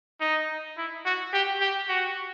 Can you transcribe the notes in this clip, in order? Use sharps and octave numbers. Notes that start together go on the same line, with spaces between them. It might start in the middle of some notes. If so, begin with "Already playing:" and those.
D#4
E4
F#4
G4
G4
F#4